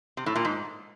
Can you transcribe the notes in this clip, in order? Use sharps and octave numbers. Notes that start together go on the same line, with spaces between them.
C3
A2
A#2
G#2